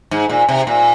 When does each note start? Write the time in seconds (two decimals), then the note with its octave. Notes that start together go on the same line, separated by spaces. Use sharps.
0.11 G#2
0.30 A#2
0.49 C3
0.67 A#2